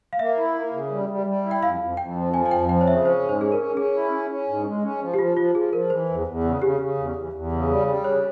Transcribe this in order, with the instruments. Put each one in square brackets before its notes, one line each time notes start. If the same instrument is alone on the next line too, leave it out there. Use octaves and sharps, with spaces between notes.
[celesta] F5
[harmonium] A#3 [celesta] E5
[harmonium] E4
A#3
C#3
G3
G3
G3
E4
[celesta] G5
[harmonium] F2 [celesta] F5
[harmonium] F2
[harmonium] F2 [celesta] G5
[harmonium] F3
[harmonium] F3 [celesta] G#5
[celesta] G#5
[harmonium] F2 [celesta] G5
[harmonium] F3 [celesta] G5
[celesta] C#5
[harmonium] C#3 [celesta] E5
[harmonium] C#4 [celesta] C5
[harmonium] G#2
[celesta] C5
[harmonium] C#4 [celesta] G#4
[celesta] A#4
[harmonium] C#4
[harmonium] C#4 [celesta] G#4
[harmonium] E4
C#4
C#4
G#2
G#3
C#4
F3
[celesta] G4
[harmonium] F3 [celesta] F4
[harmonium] F3 [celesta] F4
[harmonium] F3 [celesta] G#4
[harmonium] F3 [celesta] A#4
[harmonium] E3 [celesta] C5
[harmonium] E2
E2
C#3
[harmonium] C#3 [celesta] G4
[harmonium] C#3
E2
E2
E2
C#3
G3
G3
[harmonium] C#3 [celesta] C#5